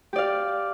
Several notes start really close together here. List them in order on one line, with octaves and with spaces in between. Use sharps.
G4 D5 F5